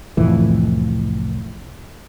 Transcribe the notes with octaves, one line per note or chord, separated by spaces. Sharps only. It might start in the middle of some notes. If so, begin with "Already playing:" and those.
C2 F2 A2 E3